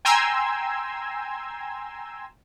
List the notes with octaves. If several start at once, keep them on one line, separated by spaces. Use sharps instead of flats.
G5 G#5 A#5 C6 E6 G#6